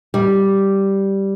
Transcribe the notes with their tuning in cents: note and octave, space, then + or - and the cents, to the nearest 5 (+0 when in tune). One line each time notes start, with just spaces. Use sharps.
G3 -5